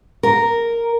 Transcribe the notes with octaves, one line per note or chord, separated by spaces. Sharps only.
A#4